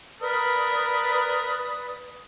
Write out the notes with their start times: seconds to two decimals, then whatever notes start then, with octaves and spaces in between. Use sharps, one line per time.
0.21 A#4 B4 D5 D#6